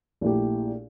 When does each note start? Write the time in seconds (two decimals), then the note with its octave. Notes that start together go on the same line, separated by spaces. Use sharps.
0.21 A#1 A#2 A3 E4 G4